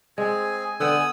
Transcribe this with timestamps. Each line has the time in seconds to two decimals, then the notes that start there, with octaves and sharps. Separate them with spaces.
0.18 G#3 C4 G#4 G#5
0.80 D3 B3 F#5 G5 D#6 E6